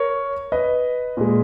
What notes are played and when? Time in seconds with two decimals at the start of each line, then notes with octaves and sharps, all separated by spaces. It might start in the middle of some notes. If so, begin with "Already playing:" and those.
Already playing: A#4 C#5
0.52 B4 D#5
1.17 A#2 G#3